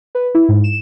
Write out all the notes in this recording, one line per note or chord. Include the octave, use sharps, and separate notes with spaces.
B4
E4
G#2
E7